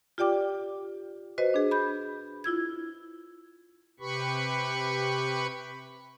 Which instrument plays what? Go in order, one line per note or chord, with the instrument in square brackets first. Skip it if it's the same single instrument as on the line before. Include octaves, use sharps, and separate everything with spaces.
[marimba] F4 G4 D5 G5 D6
F#4 B4 C5 D#5
D4 G#4
B5 G6
E4 F4 E6 G#6
[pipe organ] C3 G4 B4 B5 C#6